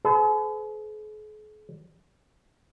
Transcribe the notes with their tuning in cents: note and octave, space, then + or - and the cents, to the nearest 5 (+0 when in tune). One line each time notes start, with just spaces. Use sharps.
G#4 +45 B4 +45